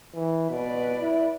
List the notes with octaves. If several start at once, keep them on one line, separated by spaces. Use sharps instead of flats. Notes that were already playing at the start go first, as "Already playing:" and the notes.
E3
B2 B4 D5
E4